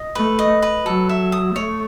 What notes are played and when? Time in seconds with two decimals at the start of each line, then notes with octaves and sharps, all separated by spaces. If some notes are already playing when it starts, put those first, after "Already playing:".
Already playing: D#5
0.15 A3 B4
0.39 D#5
0.62 B4
0.86 F#3 A4
1.09 E5
1.32 D#6
1.56 A3 C#5